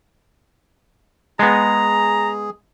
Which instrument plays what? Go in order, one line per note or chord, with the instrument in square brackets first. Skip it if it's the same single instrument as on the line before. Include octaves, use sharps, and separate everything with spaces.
[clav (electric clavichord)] G#3 B3 [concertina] G#4 [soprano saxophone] A#5